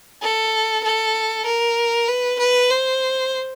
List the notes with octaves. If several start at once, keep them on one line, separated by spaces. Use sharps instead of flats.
A4
A4
A#4
B4
B4
C5